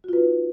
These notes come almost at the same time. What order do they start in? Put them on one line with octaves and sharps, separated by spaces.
F#4 F4 B4 D#4